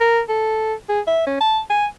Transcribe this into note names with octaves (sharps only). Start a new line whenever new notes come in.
A#4
A4
G#4
E5
C#4
A5
G#5